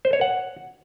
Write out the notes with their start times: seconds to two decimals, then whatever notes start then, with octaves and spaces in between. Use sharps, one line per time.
0.05 C5
0.13 C#5
0.21 F#5